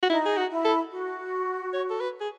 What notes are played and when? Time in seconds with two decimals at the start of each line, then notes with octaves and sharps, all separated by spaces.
0.03 F#4
0.10 D#4 E4
0.26 G#4
0.37 F#4
0.51 E4
0.65 A4
0.91 F#4
1.74 C#5
1.90 A4
2.01 B4
2.20 G#4